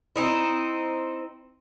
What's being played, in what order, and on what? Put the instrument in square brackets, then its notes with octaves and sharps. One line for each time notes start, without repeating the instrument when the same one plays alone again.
[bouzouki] C4 D#4 E4